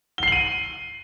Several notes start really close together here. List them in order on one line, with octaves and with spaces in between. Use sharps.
G7 C7 F#7 D#7